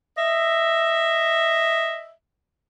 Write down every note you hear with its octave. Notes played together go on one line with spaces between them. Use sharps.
D#5 E5